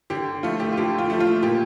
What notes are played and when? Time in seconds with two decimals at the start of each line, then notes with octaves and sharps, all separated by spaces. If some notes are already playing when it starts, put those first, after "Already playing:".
0.10 D3 G4
0.43 F3 A3 F4
0.60 G4
0.73 F4
0.77 D3 G4
0.98 F4
1.10 F3 A3
1.20 F4
1.42 A#2 G4